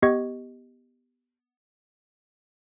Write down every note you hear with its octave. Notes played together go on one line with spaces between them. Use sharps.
B3 G4 D#5 C#6 G#6